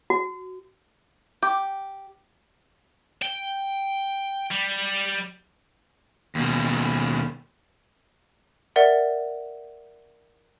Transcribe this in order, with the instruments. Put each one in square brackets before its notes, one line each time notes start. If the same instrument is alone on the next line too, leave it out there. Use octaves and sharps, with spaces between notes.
[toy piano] F#4
[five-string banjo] G4
[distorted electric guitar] G5
G3
[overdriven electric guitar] D#2 B2
[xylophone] A#4 D5 E5 F#5